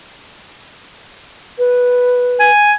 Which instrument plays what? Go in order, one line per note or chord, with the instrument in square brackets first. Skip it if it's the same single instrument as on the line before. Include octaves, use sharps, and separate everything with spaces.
[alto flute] B4
[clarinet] G#5